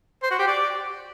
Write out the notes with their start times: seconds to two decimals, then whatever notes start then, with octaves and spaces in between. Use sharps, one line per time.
0.23 C5
0.31 F#4
0.39 G4
0.47 D5